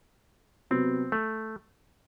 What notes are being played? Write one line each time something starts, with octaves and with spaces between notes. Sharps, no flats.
C3 F#3 B3 C4
A3